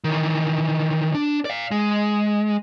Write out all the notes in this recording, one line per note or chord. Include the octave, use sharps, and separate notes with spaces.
D#3 E3
D4
D5 F5
G#3